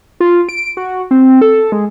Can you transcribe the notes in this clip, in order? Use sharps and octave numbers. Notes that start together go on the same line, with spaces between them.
F4
D7
F#4
C4
A4
G#3